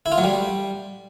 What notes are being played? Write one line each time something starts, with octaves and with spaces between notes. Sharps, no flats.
E4
F4
F#3
G3